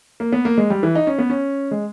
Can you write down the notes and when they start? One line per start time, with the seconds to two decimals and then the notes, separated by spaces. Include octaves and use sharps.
0.20 A#3
0.32 B3
0.45 A#3
0.58 G#3
0.70 G3
0.83 E3
0.95 D#4
1.07 C#4
1.19 B3
1.30 C#4
1.71 G#3